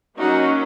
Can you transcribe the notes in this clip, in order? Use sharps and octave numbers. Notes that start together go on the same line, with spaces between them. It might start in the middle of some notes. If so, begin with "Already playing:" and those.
F#3 A#3 C#4 D#4 F#4